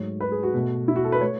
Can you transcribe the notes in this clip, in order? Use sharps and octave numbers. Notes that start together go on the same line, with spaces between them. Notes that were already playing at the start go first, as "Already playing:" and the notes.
Already playing: G#2 F#3 A3 C#5
B4
G#4
F#4
B2 A3
E4
F#4
A4
B4
A3 C#5